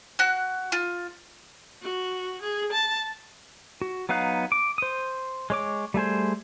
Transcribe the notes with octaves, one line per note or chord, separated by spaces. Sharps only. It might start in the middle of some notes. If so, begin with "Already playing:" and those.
F#4 F#6
F4
F#4
G#4
A5
F#4
F#3 B3 D#4 F5 F#6
D6
C5 D#6
G#3 C#5 D6
G3 A3 G#4 C5